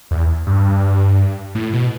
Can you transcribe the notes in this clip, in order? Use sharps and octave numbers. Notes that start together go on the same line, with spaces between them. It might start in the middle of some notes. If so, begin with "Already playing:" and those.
E2
G2
A2
B2